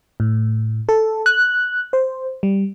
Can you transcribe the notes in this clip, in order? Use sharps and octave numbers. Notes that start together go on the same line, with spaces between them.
A2
A4
F#6
C5
G3